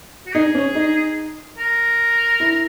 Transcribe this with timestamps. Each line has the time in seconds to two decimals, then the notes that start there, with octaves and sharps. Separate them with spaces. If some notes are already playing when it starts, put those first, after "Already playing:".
0.26 F#4
0.34 D#4 G#4
0.54 C#4
0.75 D#4
1.58 A#4
2.40 E4